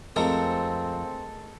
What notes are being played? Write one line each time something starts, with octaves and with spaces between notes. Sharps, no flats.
F2 G#3 A3 C4 A4 A#4